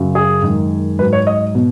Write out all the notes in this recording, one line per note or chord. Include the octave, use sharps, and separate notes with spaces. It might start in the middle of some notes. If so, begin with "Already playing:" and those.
Already playing: F#2 C#3 F#3
G#4
F#2 D#3 G#3
G#2 F#3 B4
C#5
D#5
B2